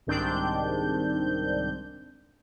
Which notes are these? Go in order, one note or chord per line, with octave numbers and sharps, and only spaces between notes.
C2 G#2 D#3 C4 D4 G6